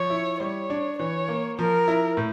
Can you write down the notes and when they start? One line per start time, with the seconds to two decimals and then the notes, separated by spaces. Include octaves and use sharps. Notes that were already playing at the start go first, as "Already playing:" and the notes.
Already playing: F3 C#5
0.10 E4
0.40 G3 C#5
0.70 D4
0.98 E3 C#5
1.28 A#3
1.58 F3 A#4
1.88 E4
2.17 A2